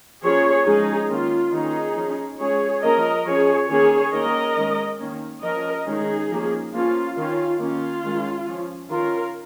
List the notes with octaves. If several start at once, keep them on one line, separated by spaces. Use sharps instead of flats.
F3 A#3 C#4 G#4 C#5
F3 G#3 C#4 D#4 G#4
D#3 A#3 C#4 F4
D#3 A#3 C#4 D#4 G#4
F3 C#4
F3 G#3 C#4 G#4 C#5
F3 A#3 C#4 A#4 D#5
F3 C#4 G#4 C#5
D#3 A#3 C#4 G#4 C#5
D#3 A#3 C#4 A#4 D#5
D#3 G#3 C#4
D#3 A#3 C#4
F3 C#4 A#4 D#5
D#3 G#3 C#4 D#4 G#4
F3 A#3 C#4
F3 A#3 C#4 F4
D#3 C#4 F4
D#3 A#3 C#4 F4
D#3 G#3 C#4
F3 C#4
D#3 C#4 F4 A#4